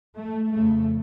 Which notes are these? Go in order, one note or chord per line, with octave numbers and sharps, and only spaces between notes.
A3
F2 C#3 A3